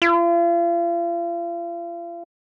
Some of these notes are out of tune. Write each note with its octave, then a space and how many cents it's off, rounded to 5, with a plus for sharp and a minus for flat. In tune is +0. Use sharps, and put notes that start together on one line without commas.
F4 -40